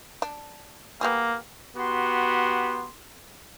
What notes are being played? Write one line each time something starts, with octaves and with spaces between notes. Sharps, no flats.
D4
A#3 B3 G4 G#4
B3 F#4 G4 C6